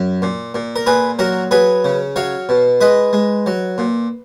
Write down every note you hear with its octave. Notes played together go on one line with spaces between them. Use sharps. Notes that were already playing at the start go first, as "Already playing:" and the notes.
Already playing: F#2
A#2
A#2
A#4
A#2 G#4 B4
F#3 F#4 A#4
F#3 G#4 B4
C#3
F#3 C#5 F5
B2
G#3 B4 D#5
G#3
F#3
A#2